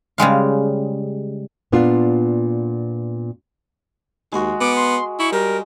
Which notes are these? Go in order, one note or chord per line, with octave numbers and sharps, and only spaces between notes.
C#3 G3 G#3 F5
A#2 B3 D4 F4
D#2 G#3 F#4
B3 D6
C6
E4 C#6
G3 A#4